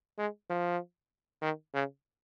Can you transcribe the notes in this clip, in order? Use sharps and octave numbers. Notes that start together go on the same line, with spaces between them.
G#3
F3
D#3
C#3